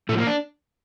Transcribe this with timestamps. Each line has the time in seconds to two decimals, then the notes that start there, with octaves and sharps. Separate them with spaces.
0.09 A2 F3 A3
0.18 A#3
0.27 D4